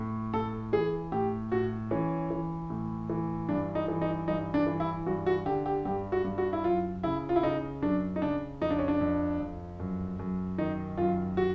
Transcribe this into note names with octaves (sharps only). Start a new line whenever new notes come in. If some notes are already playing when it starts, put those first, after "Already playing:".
Already playing: A2
A2 A4
E3 G#4
A2 G4
A2 F#4
E3 C#4
E3
A2
E3
G2 D4
D#4
E3
D#4
G2 D#4
D4
E3
E4
G2 F#4
F#4
D3 G4
G4
G2 G4
F#4
G2
F#4
E4
F#2 F4
C#3 E4
F4
E4
C#3 D#4
F#2 D4
D#4
C#3 D4
F2 D#4
D4
C#4
D4
F2
F2
F#2
F#2
D#3 D#4
F#2 F4
F#4